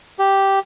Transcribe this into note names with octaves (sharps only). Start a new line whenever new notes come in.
G4